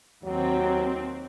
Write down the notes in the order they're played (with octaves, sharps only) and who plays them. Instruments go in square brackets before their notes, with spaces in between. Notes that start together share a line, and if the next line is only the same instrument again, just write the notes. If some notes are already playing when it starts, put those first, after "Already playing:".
[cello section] D#2 C4 [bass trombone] F#3